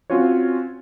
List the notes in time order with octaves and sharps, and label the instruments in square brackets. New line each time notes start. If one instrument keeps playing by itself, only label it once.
[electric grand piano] C4 C#4 F4 F#4 C#5